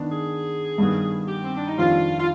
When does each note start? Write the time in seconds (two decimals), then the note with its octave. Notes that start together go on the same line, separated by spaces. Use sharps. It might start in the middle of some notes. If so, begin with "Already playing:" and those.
Already playing: D#3 B3 D4
0.12 G#4
0.78 G2 D#3 G3 B3
1.28 G4
1.44 C4
1.55 D4
1.67 D#4
1.78 F2 D#3 G3 D4 F4
2.19 F4